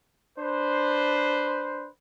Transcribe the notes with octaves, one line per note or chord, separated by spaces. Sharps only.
D4 B4 C5